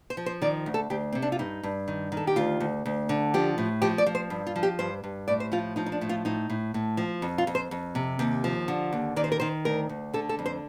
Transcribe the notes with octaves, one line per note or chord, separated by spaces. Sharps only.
C5
F3
C5
D#3 D5
D2
A4
D2 G4
C3 C4
D4
F4
G2 D#4
G2
D#3
D#3
A4
G4
D2 F4
D2
D2
D3
F3 G4
A2
F3 G4
D5
F3
C5
G2
F4
F3
G4
G2 C5
G2
A2 D5
C5
F3 F4
F3 D#4
D#4
D4
A2
F4
A2 D#4
A2
A2
F3
F2
F4
F2
C5
F2
C3
D#2
F3
D3
D#2
D#3 D5
C5
A#4
D#3 C5
D2 A#4
D2
D3 A4
A4
F2
C5